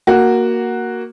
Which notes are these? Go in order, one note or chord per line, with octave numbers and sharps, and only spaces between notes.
A#3 F#4